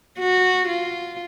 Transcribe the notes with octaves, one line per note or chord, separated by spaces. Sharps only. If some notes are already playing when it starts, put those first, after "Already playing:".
F#4
F4